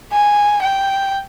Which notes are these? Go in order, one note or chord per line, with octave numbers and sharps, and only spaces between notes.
G#5
G5